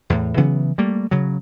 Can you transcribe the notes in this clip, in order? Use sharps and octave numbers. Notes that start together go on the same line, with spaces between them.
E2 A2
C#3 E3 F#3 B3
G3 A3 A#3
C#3 F#3